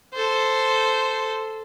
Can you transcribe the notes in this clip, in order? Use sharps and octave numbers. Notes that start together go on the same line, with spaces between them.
A4 C5